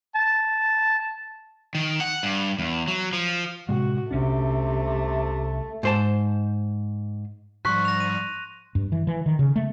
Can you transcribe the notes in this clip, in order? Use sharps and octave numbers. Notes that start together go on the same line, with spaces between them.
A5
D#3
F#5
G2
E2
F#3
F3
A2 C3 G#3 F#4
C2 C3 A3 C#4 D4
G#2 C5 A5
G#2 F3 G3 C6 C#6 F#6 B6
A#6 F7
D#7
G2
E3
E3
D#3
C#3
A3